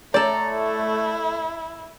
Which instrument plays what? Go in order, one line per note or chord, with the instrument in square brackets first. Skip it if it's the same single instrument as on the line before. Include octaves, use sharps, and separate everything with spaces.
[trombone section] A3 [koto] A4 D5 [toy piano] C#5 [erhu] A#5
[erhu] E4